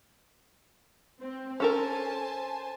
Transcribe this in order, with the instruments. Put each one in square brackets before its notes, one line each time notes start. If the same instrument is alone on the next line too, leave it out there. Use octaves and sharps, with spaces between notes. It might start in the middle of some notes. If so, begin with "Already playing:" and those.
[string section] C4
[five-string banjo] C#4 A4 A#4 [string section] C5 G#5 A5